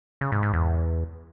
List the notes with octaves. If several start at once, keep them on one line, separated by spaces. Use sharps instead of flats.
C#3
G#2
G#2
E2